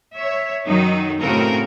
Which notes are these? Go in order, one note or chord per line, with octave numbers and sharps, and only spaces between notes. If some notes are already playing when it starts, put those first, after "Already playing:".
C#5 E5
F#2 D#3 F#3 D#4
A2 C#3 C4 F#4 A#4